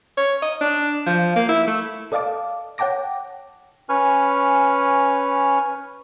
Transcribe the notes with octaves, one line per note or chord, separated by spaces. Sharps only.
C#5
D#5
D4
F3
A#3
E4
A3
A4 D5 D#5 F5 A5 D6
C#5 F#5 G5 A5 D6 A#6
C#4 B4 G#5 C#6 F6